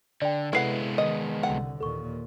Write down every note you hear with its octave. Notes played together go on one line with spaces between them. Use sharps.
D3 D5 G5
C3 G#3 B3 E4 A4 B4 F#5 C7
D#3 D#5
C2 D3 F#5
D#2 A#2 A4 C#6